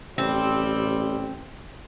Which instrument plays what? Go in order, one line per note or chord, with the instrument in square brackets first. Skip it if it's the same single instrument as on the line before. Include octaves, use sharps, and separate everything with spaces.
[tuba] A1 [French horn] G3 [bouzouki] C4